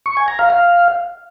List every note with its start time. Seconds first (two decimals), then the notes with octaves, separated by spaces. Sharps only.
0.06 C#6
0.17 G#5
0.28 A#5
0.39 F5
0.50 F5